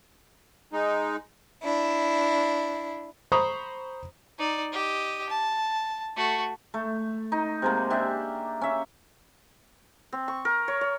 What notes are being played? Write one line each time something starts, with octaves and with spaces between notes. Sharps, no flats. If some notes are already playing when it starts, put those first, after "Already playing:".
G#3 D#4
D4 E4
C5 A#5 B5 C#6 D#6
D#4 D5
G4 D#5
A5
A3 F#4
A3
D#4
C3 G#3 A#3
D4 G4 E5
C#4 E5
C4
C#6
A#4
C#5
C#5